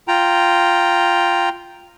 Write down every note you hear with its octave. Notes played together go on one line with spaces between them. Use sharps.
F4 G5 A#5